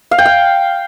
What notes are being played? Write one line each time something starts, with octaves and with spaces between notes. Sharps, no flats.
F5
G5
F5